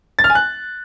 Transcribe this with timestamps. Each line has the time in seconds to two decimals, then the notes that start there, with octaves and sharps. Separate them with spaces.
0.19 A6
0.24 F6
0.30 G#5
0.35 F#6